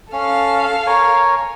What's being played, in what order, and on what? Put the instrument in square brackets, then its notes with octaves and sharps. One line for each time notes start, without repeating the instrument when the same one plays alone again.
[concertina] C#4 [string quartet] A4 F5
[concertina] A#4 C#5 G#5